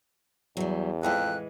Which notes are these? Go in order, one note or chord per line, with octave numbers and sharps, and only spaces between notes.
E2 F#3 G3
F2 A2 E3 G#3 F#6